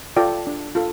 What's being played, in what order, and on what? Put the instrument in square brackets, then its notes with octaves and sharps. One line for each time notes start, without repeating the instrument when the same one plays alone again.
[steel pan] F4 A4 D5 G5
D4
F4 A4